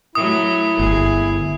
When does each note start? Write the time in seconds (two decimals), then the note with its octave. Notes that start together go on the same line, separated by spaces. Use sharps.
0.15 F#3 A3 E4 D#6
0.79 G1 G#4